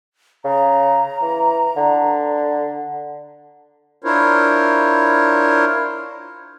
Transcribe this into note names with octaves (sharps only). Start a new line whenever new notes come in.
C#3 A#5
E3
D3
D4 E4 F4 A#4 C5 C#5